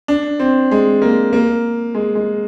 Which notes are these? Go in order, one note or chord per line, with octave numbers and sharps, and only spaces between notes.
D4
C4
G#3
A#3
A#3
G#3
G#3